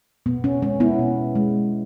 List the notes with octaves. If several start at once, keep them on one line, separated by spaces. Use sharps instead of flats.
B2 B3
C#4
G#3 C#4
B3 E4
B2
G#3